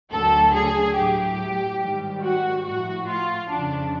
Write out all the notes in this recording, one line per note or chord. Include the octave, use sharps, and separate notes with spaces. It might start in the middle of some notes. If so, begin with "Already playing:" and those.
D2 D3 F#3 A4
G#4
A2 F#3 G4
G#2 D#3 G3
F#4
A2 F3 F#4
F4
F2 C#3 F3 D4